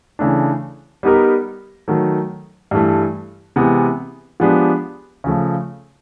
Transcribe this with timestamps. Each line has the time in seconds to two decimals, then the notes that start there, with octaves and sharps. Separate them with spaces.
0.19 C#3 E3 A3 D4
1.03 G3 B3 D#4 G4 A#4
1.88 D#3 F#3 A3
2.71 G2 E3 A3
3.56 C3 E3 G#3 B3
4.40 F3 G#3 B3 D4 G4
5.24 C#3 F3 A3